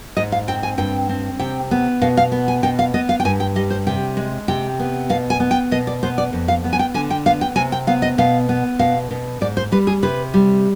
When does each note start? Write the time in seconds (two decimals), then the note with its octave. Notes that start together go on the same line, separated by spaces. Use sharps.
0.17 G#2 D#5
0.32 F5
0.48 C4 G5
0.63 G#5
0.78 G2 G5
1.09 C4
1.39 C3 G5
1.71 B3
2.02 B2 F5
2.17 F5
2.32 B3
2.48 G#5
2.63 B2 G5
2.79 F5
2.94 B3 D#5
3.09 F5
3.20 G5
3.25 G2 G#5
3.40 G5
3.56 G3 D#5
3.70 C5
3.87 C3 G5
4.17 G#3
4.48 C3 G5
4.80 B3
5.10 B2 F5
5.30 G#5
5.40 B3
5.51 G5
5.71 B2 D#5
5.87 D5
6.03 B3 C5
6.18 D5
6.33 F2
6.48 F5
6.64 B3
6.73 G#5
6.79 G5
6.94 D3 G#5
7.10 G5
7.26 B3 F5
7.41 G5
7.56 C3 G#5
7.72 G5
7.87 B3 F5
8.02 D#5
8.18 B2 F5
8.49 B3
8.79 B2 F5
9.11 B2
9.41 G#2 D5
9.57 C5
9.72 G3 B4
9.87 G#4
10.03 C3 B4
10.34 G3